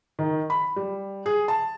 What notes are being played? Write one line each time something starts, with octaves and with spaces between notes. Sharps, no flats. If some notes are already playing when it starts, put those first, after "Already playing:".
D#3
B5
G3
G#4
A5